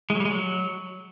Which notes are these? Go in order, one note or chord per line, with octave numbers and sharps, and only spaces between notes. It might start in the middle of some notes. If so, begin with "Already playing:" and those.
G#3
F#3
G3
G#3
F#3